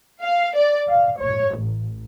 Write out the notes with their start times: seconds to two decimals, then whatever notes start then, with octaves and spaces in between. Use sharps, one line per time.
0.21 F5
0.56 D5
0.88 F5
1.19 C#5
1.56 A1